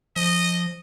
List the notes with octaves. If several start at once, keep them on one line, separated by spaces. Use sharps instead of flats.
F3 D#5